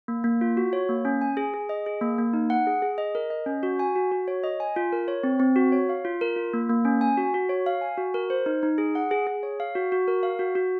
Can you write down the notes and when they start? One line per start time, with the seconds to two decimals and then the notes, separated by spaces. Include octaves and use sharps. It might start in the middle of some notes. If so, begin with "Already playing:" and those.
0.08 A#3
0.24 A#3
0.41 F4
0.57 F#4
0.73 C#5
0.89 A#3
1.05 C#4
1.21 G#5
1.37 G#4
1.54 G#4
1.69 D#5
1.86 G#4
2.01 A#3
2.18 A#3
2.33 D#4
2.50 F#5
2.67 G#4
2.82 G#4
2.98 D#5
3.15 A#4
3.30 D#5
3.46 C#4
3.63 F#4
3.79 G#5
3.96 F#4
4.12 F#4
4.28 C#5
4.44 D#5
4.60 G#5
4.76 F4
4.92 A#4
5.08 C#5
5.23 C4
5.40 C4
5.56 F#4
5.72 C#5
5.89 F5
6.05 F4
6.21 A#4
6.36 F4
6.54 A#3
6.70 A#3
6.85 C#4
7.01 G#5
7.17 F#4
7.34 F#4
7.49 C#5
7.66 F5
7.81 G#5
7.97 F#4
8.14 A#4
8.30 C5
8.46 D#4
8.63 D#4
8.78 G#4
8.95 F#5
9.11 G#4
9.27 G#4
9.43 C#5
9.60 F5
9.75 F#4
9.92 F#4
10.08 A#4
10.23 F5
10.39 F#4
10.55 F#4